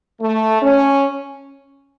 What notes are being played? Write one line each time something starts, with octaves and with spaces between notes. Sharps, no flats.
A3
C#4